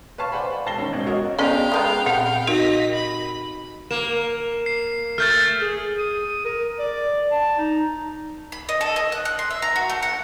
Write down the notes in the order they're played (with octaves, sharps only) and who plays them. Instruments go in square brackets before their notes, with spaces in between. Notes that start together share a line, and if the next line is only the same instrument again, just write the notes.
[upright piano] B4 C#5 F5 A5 C#6
C5 D5 F#5 G#5 B5
E1 A5 A#6 C7 G7
D#3 C#4
G#1 C#2
F#4 A#4 C#5 D#5
[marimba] B3 G#4 D5 [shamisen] C#4 D#5 [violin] F5 G5
[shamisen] G#3 A#3 B3 [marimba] D#6 G6
[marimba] A#2 C4 [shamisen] F#5
[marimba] D#4 F#4 A#4 [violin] D#5 B6
[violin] B5
[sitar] A#3 [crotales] E7
[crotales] C7
[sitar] A3 [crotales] F6 G6 A6
[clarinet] G#4
D#6
A#4
D5
A5
D#4
[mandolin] B5
D#5
A4
D#5
F#6
F#6
C6
E5
A#5
F#4
A3
F#5